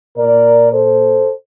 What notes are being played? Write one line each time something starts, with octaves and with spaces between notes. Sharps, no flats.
A#2 A#4 D5
A4 C5